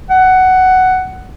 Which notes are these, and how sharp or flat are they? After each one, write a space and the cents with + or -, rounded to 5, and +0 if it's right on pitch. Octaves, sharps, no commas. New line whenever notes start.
F#5 +10